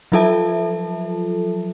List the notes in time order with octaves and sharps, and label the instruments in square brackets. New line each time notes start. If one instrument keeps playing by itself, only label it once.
[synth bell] F3 F#3 F4 A4 E5 A5